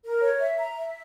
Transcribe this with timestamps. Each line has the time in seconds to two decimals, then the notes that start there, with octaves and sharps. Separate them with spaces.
0.03 A#4
0.21 C#5
0.40 E5
0.58 A#5
0.76 E5